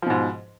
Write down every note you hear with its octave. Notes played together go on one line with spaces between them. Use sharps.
G#2 B2 F3